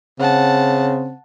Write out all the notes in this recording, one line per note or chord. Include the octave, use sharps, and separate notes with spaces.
C#3 C4 F#5 A5